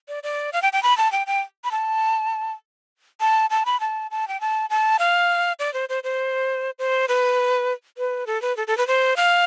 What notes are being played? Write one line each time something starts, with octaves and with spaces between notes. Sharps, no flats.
D5
D5
F5
G5
G5
B5
A5
G5
G5
B5
A5
A5
A5
B5
A5
A5
G5
A5
A5
F5
D5
C5
C5
C5
C5
B4
B4
A4
B4
A4
A4
B4
C5
F5